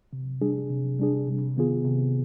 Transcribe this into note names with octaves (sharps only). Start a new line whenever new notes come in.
C3
G3 D4 G#4
C3
G3 D4 G#4
C3
D#3 B3 F4 G#4
C3